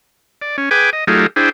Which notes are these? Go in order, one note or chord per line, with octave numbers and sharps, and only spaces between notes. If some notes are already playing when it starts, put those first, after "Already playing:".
D5
C#4
G#4 B4 G5 G#5 D6
D#5
F#3 A3 D#4 F4 G4 G#4
D4 E4 G#4 C5 G5